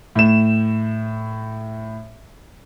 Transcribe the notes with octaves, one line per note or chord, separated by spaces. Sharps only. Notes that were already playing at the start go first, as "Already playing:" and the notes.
A2 E7